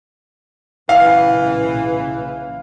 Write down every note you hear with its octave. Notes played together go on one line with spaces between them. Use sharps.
B1 A#2 C#3 E3 F5